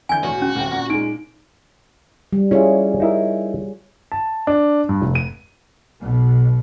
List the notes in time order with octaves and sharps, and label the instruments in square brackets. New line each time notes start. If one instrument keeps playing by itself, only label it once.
[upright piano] D3 E3 G6 [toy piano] G#5
[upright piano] E1 A1 [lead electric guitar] F#4
[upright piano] E1 [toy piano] C#4
[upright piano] D#1 C#3 G5
A#2
[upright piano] A#2 G#3 [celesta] D#4 D7
[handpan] G3
[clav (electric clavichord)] C#4 E4 [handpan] F4 G#4 C#5
[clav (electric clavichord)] D#4 E4 A#4
[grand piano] A5
D4
G2
F1
D#7
[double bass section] B1 B2